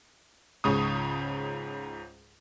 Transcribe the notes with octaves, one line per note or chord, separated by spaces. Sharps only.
C#2 G#2 C#3 C#6 D#6